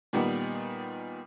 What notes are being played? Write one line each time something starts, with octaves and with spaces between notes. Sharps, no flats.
A#2 D#3 G3 B3